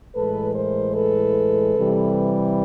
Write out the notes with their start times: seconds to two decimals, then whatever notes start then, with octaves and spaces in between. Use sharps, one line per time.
0.14 A2 E3 G#3 A4 B4
0.54 A#4 C5
0.94 A4 B4
1.75 C3 E3 G3